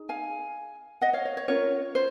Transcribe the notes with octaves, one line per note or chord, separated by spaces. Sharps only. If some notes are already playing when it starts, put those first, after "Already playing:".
Already playing: D#4 G#4
F5 G#5
D#5 F#5
C#5 F5
C#5
C#5
C#4 F4 A#4 C#5
C5